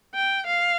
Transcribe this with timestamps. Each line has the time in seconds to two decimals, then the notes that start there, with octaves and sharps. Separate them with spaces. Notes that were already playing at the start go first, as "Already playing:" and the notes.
0.14 G5
0.47 F5